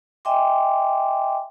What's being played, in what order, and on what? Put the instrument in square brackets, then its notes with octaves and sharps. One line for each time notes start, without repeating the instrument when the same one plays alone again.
[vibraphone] D#5 E5 G5 G#5 C6 D6